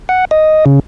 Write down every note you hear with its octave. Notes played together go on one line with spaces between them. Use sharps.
F#5
D#5
C#3